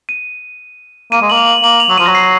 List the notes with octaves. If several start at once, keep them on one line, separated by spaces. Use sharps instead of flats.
D#7
A#3 D#7
G#3
A#3 F#7
F7
F#7
A#3 F#7
F7
F#3
F3 D#7
F#3 A#6
C7